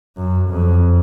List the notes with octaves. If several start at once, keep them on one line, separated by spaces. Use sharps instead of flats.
F#2
F2